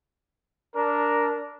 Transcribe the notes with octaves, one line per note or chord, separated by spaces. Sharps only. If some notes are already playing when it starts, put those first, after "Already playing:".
D4 A#4